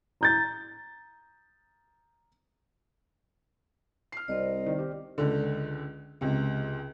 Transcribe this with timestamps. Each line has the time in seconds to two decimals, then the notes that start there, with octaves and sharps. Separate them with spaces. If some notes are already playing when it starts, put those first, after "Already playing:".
0.21 A#5 G6 A6
4.12 F6 C7
4.28 C2 C4 C5 D5 D#5
4.66 D#3
4.78 C4 G4
5.18 C#2 D3
6.21 C#2 C3